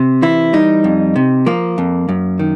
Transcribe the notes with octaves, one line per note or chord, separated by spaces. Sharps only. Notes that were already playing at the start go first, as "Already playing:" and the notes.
Already playing: C3
E3 E4
G3 D#4
F2
C3
F3 A#3
F2
F#2
D#3